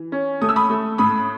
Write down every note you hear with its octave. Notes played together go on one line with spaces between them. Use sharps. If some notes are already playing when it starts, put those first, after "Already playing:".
Already playing: E3
C#4
A3 D#6
E6
B5 D#6
A3
A2 B5 D#6